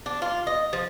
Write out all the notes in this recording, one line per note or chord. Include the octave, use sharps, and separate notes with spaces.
D4
F4
D#5
F3